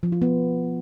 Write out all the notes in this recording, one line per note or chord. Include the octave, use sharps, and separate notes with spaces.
F3
F4
B3